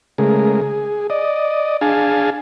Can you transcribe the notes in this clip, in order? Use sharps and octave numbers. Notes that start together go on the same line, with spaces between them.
C#3 G#3 A3 G#4 A#4
G#4
D5 D#5
D4 G#4 F5 G#5 A5